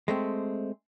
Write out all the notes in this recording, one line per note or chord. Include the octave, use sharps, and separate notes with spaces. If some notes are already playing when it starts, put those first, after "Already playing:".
G#3 A3 C4